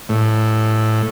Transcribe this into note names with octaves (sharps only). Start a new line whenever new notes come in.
A2